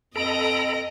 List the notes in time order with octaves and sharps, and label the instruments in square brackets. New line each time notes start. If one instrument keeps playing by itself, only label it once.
[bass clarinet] F2 [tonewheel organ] A4 A#5 B5 [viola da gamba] D#5 [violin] A#6 D7